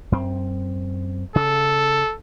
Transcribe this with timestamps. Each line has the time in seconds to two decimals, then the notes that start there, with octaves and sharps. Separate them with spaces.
0.12 F#2 C4
1.36 C#3 A4